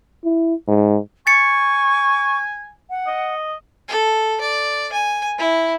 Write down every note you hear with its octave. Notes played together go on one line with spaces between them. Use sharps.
E4
G#2
G#5 C#6 A6 C#7
F#5
D#5
A4
D5
G#5
E4